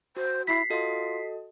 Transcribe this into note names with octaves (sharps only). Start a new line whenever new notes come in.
F#4 C5
E4 B6 C7
F4 F#4 A4 D#5